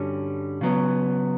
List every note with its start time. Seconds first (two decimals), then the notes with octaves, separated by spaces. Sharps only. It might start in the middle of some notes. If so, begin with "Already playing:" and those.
Already playing: G2 D3 G3 C#4 F#4
0.61 C#3 F#3 B3